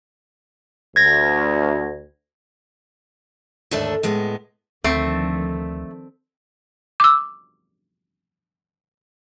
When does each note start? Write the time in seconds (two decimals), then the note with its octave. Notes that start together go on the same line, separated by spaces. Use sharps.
0.96 D2 G#6 A#6
3.71 D#2 G#2 D3 A3 D4 E5
4.03 A2 G#3 B3
4.84 D2 D3 D#3 F3 A3 C4
7.00 D6 E6